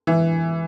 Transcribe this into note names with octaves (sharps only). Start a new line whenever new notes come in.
E3